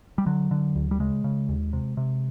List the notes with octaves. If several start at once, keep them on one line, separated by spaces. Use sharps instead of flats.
G3
D3 F#3
D3
D2
G3
C#3 G#3
C#3
D#2
C3
C3